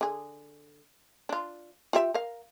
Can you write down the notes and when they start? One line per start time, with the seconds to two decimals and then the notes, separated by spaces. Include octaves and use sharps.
0.01 D3 G#4
1.29 D4 F4
1.93 F4 G4 E5
2.14 A#4 F5